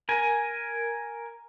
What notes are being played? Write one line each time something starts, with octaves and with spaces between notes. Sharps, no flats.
A#4 G#5